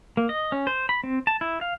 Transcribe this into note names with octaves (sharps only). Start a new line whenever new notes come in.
A#3
D#5
C#4
C5
B5
C4
A5
E4
F5